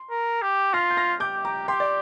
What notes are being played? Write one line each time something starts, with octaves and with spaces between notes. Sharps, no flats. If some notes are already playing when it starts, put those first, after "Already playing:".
Already playing: C6
A#4
G4
F4 F6 A#6
G6
F6 A#6
G4 D6 G6
A#5 D6
G4 G5 C6
D5